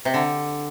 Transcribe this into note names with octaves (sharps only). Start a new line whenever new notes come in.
C3
D3